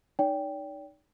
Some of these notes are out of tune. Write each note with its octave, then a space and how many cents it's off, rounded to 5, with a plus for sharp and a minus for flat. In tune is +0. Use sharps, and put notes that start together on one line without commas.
D#4 -20 D5 -45 G5 +0